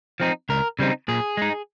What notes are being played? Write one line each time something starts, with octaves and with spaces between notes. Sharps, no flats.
F3 C4 D#4
C#2 A#4
C#3 G3 C4 D#4
A#2 G#4
G#3 D#4